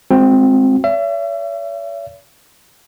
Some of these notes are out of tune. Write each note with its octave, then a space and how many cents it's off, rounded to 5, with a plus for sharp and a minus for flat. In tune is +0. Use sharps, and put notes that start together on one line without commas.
G#3 +0 C4 +0 F#4 -35
C#5 +45 E5 +35